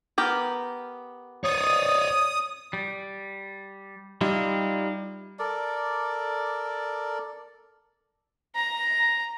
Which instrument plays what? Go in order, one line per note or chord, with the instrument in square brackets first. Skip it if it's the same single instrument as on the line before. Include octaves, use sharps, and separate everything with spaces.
[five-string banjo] B3 G4 A#4
[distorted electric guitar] C#5 D5 [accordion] D#6
[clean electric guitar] G3
[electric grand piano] G3 [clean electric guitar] D#4 F4 E5
[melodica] A4 A#4 D5
[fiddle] A#5